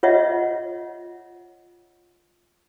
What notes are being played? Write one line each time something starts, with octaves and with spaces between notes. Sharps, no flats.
F4 C#5 D#5 E5 F#5